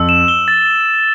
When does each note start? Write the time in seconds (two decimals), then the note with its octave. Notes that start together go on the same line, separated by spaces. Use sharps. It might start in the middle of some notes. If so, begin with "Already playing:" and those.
Already playing: F2 E6
0.09 E7
0.28 G7
0.48 A6